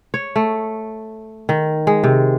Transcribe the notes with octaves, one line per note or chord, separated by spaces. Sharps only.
C#5
A3
D#3
G#3
C3